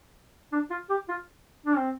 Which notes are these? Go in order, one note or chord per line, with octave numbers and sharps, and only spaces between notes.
D4
F4
G4
F4
D4
C4